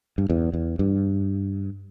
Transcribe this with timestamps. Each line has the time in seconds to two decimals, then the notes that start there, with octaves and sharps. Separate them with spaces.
0.18 G2
0.30 E2
0.53 E2
0.79 G2